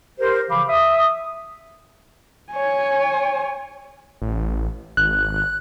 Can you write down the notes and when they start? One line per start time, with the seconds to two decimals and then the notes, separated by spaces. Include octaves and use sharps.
0.20 G4 A#4 C5
0.50 C#3 E3 F3 F5 B5 D6
0.68 E5 D#6
2.52 C#5 G#5
4.22 A1
4.97 G#1 F#6